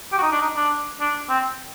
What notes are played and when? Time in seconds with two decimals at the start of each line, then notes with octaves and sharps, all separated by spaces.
0.12 G4
0.18 F#4
0.22 D#4
0.32 D4
0.41 D#4
0.56 D4
1.00 D4
1.29 C4